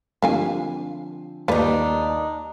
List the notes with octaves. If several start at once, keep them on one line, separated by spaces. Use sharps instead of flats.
D3 F3 G3 C4 F5 G#5
D#2 G3 D4 D#4 F4 B4